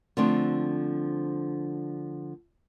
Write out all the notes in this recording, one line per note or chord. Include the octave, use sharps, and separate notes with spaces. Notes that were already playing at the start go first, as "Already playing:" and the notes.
D3 F3 A3 C4 D4